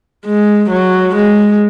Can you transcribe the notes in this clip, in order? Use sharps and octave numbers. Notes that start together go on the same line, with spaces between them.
G#3
F#3
G#3